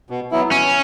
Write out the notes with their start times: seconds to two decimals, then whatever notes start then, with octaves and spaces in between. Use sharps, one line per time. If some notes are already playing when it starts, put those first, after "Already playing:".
0.10 B2
0.31 F#3 B3 E4
0.51 B2 C#4